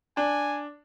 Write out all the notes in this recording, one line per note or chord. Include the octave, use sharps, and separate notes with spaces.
D4 G#5